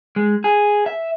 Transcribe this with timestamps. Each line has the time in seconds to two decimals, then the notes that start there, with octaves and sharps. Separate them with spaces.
0.16 G#3
0.44 G#4
0.86 E5